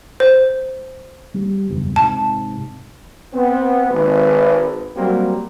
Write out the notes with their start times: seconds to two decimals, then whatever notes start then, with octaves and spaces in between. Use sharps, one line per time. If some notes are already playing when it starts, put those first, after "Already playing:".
0.20 C5
1.34 G3
1.70 F#1 E2 G2
1.96 G#2 C3 A5
3.33 B3 C4
3.90 G#1 B4
4.97 F#3 G3 A#3 C4